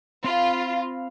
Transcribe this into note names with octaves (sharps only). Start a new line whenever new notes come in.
C4 F4 F5 B5